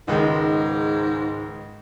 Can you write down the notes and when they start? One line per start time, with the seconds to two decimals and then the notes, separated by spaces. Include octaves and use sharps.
0.08 C#2 G#2 D#3 G#3